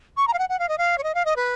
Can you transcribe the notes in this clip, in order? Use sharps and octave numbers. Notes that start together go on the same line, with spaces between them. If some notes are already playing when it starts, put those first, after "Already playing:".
C#6
A#5
F5
F#5
F#5
F5
D#5
F5
C#5
D#5
F5
D#5
B4